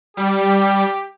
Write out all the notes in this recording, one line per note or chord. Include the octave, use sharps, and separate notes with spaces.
G3 G4